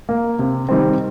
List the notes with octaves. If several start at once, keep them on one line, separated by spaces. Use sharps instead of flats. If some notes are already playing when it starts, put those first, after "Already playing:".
A#3
C3
D#3 G3 C4